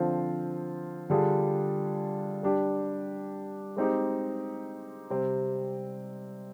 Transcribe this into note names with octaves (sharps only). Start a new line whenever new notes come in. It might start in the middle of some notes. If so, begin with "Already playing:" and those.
Already playing: D3 F3 C4 F4
D3 G3 D4 F4 G#4
G3 D4 G4
G#3 C4 D#4 G4
C3 G3 C4